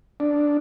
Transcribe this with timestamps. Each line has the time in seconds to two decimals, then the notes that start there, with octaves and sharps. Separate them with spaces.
0.20 D4